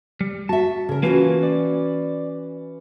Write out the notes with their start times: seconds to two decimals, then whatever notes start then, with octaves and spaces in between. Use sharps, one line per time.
0.21 G3
0.49 F#4 E5 A5
0.89 C#3 A#4
1.03 E3 A#3 C#4 F4 F#4
1.43 D5